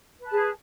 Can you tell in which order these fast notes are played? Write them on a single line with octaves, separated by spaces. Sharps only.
B4 A5 G#4